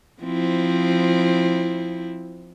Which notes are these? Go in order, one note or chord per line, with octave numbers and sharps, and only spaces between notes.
F3 C4 E4